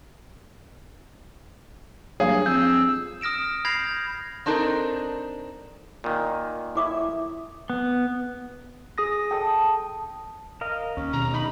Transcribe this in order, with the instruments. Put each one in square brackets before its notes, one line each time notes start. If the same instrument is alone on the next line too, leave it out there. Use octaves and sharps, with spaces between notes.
[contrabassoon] G2 [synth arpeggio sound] F#3 A#3 [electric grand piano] G#4
[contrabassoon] F2 [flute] E6 [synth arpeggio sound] G6
[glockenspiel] D#6 F6 A#6 D7 E7
B5 G6 G#6 A#6 C7 F7
[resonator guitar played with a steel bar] C4 D4 D#4 A4 A#4
[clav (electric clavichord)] A#2 D#3
[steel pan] E4 C#5 E5 [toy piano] G#5 D6 D#6
[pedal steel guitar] B3
[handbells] G#4 D#6 A#6
[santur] A4 D#5 [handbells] G5 D#6
[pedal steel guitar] A#4 D#5 F5
[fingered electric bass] D#2 [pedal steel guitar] C#4
[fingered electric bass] B2 D#3 [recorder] A#5
[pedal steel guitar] D#4 [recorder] B5